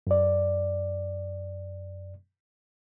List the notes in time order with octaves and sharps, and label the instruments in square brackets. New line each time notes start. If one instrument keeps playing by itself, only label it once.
[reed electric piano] F#2 D5